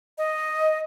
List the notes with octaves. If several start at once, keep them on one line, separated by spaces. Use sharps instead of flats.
D#5